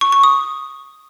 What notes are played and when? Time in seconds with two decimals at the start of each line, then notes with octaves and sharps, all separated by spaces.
0.01 C#6
0.12 C#6
0.24 D#6